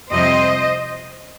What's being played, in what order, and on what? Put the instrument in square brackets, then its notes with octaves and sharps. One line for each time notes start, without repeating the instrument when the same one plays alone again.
[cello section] F2 C3 G3 C4 C5 D#5